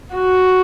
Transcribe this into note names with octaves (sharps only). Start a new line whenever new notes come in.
F#4